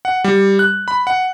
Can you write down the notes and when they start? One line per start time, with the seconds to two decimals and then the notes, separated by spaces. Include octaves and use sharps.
0.05 F#5
0.24 G3
0.59 F#6
0.88 B5
1.07 F#5